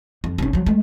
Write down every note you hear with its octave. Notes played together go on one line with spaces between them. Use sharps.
F2
F1 C#4
F3 F#3
G#3 A3